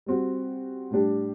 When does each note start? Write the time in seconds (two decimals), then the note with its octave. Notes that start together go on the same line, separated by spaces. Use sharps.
0.06 G3 C4 F#4
0.91 A2 G3 D4 G4